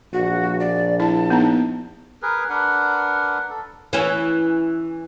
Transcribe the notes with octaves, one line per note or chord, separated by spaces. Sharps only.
A#1 F#4
D5
E4 A5
B3 D#4
G#4 A#4 B4
D4 A#4 B4 F#5
A4
E3 C#4